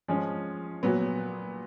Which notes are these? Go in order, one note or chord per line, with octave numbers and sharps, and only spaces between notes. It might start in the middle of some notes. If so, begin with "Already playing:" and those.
F3 G#3 C#4
A#2 F#3 B3